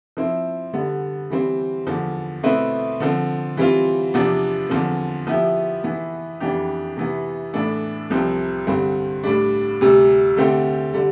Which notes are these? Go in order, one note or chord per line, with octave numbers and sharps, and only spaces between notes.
F3 C4 E4
D3 G3 B3
E3 G3 C4
E2 D3 F3
B2 A3 C4 E4 B4
D3 F3 C4
E3 G3 C4 F4
E2 C3 F3 B3 D4
E2 D3 F3 C4
F3 B3 E4 G4
E3 B3 E4
F2 E3 B3 D4 G4
C3 E3 B3
A2 E3 B3 D4 A4
C2 C3 F3 C4
G2 D3 G3 C4
A2 G3 D4
D2 C3 G3
D3 A3 C4 G4
D3 G3